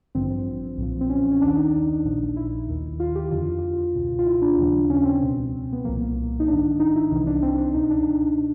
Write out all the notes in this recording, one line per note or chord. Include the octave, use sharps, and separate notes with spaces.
A1 G2 D3 F3 C4
C4
B1 A#2 F3
C4
C#4
C#4
D#2 D#3 D4
D#4
A#1 A#2 F3
E4
D#2 D#3
F4
G4
F2 D3 F3 F4
C#2 B2
F4
E4
D4
D#2 C#3 F3
C#4
C4
C#2 B2
B3
C2 A#2 F3 A#3
D#4
A1 G#2 D#3 D4
D#4
E4
C2 C3 E3 D#4
D4
C4
D4
C#2 B2 D#4
D4
B2